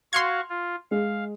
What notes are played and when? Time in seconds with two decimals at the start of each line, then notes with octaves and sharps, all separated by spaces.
0.13 F#4 F5 C6 C#6 F6 G#6
0.50 F4
0.91 G#3 F5